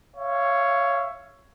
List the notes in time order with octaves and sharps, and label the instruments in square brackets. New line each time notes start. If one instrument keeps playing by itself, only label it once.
[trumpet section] C#5 E5 F5